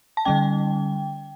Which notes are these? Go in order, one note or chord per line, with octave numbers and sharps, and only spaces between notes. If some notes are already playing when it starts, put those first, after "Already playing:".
A5
D3 G3 C#4 G5